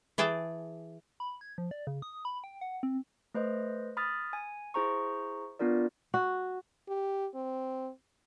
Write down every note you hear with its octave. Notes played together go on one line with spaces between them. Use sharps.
E3 G#4 G5 A5
B5
G#6
F3
D5
C#3
D#6
B5
G5
F#5
C4
A3 B4 C5 D#5
B5 D#6 F6 A6
G#5
E4 G#4 C5 A#5 C#6
B3 D4 F4 A#4 D5
F#4
G4
C4